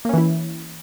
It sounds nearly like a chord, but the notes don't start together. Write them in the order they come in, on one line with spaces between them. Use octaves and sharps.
A#3 C#4 E3 E4